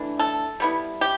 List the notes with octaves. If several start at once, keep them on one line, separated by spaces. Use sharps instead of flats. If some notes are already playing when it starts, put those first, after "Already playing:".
Already playing: E3 A3 D4
A4
G3 B3 E4
G4